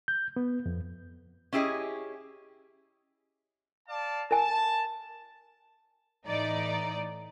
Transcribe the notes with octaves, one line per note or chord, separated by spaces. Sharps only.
G6
B3
F2
C#4 E4 G4 G#4 D#5
D5 F5 A5
A#4 G#5 A5
A2 E3 D#4 D5